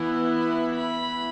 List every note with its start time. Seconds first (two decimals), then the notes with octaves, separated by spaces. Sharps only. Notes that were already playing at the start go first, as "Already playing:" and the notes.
Already playing: E3 B3 E4
0.37 B5
0.75 B5